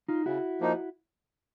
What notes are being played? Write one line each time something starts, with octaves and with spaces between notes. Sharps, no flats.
D#4 F4
C#3 E4 F#4
F3 A#3 D#4